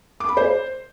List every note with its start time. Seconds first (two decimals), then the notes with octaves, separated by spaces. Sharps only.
0.20 D6
0.29 B5
0.37 C5